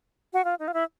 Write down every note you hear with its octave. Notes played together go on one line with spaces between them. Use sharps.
F#4
F4
D#4
F4
E4